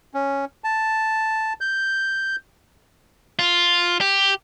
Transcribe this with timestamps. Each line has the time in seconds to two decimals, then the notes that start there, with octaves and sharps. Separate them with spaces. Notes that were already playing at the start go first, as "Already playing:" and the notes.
0.14 C#4
0.64 A5
1.61 G6
3.39 F4
4.01 G4